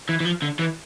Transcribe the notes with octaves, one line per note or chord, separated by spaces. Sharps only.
E3
E3
F3
D3
E3